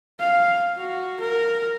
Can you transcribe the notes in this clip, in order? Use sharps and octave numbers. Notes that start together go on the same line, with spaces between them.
F5
F#4
A#4